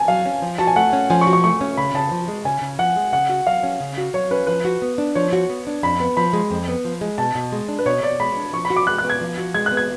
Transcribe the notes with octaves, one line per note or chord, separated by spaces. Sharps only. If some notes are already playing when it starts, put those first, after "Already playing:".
Already playing: G#5 A5
F#3 F5
C#4
F3
F#4 A5
G#5
A3 F#5
C#4
F3 G#5
C#6
F#4
C#6
A3 C#6
C#4
C#3 B5
C#3 A5
F3
G#3
C#3 G#5
C#3
F3 F#5
G#3
C#3 F#5
F#4
F#3 F5
C#4
C#3
F#4
F#3 C#5
C#4 B4
F3 B4
F#4
B3
D4
F3 C#5
F#4
B3
D4
F2 B5
B3
F3 B5
G#3
F2
B3
F3
G#3
B2 A5
B2
G#3
D4
B4
B2 C#5
B2 D5
G#3 B5
D4
F3 C#6
B5
F#4
D6
G#3 F#6
F#6
B3
G#6
F3
F#4
G#3 G#6
F#6
B3
G#6